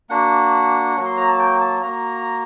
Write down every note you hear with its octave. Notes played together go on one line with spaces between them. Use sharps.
A#3 D4 F#4 F#5
F#3 A#3 F#4
C6
A#5
A5
G5
A5
A#3 F#4 A#5